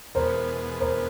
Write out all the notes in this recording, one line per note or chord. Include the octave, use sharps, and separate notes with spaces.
E2 B2 G#3 B3 A#4 C5
A#4 C5